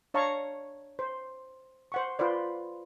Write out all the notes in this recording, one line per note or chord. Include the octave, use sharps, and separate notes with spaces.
D4 C#5 F5 A5 A#5 C#6
C5
C5 F#5 C#6
F4 B4 C5 D5